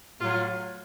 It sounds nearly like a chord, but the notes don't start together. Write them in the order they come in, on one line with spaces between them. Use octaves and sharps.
A2 F4 F#3